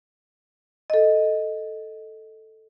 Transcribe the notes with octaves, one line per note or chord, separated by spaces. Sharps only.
A4 D#5